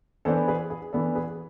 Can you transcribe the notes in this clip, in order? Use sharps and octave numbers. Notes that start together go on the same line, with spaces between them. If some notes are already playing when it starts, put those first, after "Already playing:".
E3 B3 D4 A4 C5
G#4 B4
G#4
E3 B3 D4 A4
G#4 B4